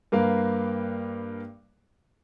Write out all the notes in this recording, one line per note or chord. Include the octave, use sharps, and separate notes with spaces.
G2 A#3 A#4 B4 F5